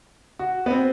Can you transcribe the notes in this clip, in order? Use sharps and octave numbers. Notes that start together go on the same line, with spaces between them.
F#4
B3
C4